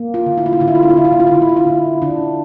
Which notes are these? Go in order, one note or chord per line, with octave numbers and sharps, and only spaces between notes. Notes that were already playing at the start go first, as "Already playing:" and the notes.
Already playing: A#3
F4
D3
E4
F4
E4
D3 F4
E4
F4
E4
F4
D3 E4
F4
E4
F4
E4
D3 F4
E4
F4
E4
D3
D3 D4